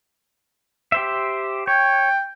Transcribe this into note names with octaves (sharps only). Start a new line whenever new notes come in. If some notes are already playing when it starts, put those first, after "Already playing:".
G4 C5 E5
C#5 G5